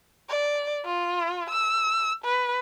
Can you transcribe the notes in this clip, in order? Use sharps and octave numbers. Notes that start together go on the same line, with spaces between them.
D5
F4
E6
B4